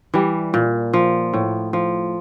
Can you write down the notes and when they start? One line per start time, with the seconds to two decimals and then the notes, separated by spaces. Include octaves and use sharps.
0.14 E3 G3
0.54 A#2
0.93 F3
1.33 A2
1.73 F3